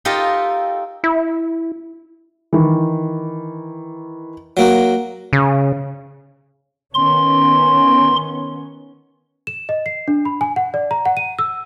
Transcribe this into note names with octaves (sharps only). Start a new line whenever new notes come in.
D#4 F4 G4 A4 A#4 D#5
E4
D#3 E3
F#3 A#3 F#4
C#3
D#3 B3 C#4 C6
E7
D#5
C7
D4
B5
G#5
F#5
D5
A#5
F#5
D#7
E6